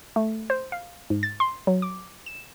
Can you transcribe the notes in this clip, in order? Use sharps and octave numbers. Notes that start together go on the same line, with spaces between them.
A3
C5
F5
G#2
A6
C6
F#3
D6
E7